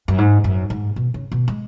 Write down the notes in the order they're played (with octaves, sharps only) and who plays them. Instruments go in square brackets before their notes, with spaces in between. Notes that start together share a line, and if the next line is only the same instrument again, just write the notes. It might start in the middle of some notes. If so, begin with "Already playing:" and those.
[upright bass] F#2
G#2
F#2
G#2
B2
C#3
B2
G#3